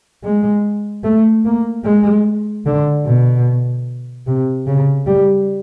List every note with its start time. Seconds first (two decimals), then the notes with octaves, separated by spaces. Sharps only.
0.24 G#3
1.04 A3
1.45 A#3
1.85 G#3
2.66 D3
3.05 B2
4.26 C3
4.67 C#3
5.07 G3